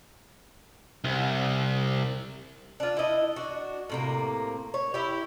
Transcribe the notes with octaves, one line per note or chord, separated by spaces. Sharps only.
C2
D4 F4
E4 D#5
D4 F#4
A2 C3 A#3
C#5
E4 G4